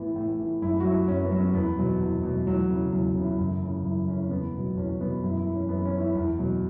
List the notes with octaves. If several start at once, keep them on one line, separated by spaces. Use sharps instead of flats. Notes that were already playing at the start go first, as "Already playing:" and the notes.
Already playing: A2 E3 B3
A2
E3
F#2 E4
F#4
F#3 E4
F#2 C#4
B3
F#3
C#4
E2 B3
B2 F#3
E2
B2 F#3
E2 F#3
C#3 E3
E2 F#3
C#3 E3
E4
F#2
C#3 E3
F#2 E4
C#3 E3 C#4
C#4
E2 B3
B2 F#3
E2 C#4
B2 F#3 B3
F#2 E4
E4
E3
C#4
F#2 B3
C#4
E3
E4
E2 E4
B2 F#3